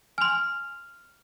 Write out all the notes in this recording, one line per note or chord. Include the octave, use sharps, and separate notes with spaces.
G#5 C6 F6 F7